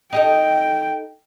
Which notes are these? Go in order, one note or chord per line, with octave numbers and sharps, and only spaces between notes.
D#4 G4 A4 G5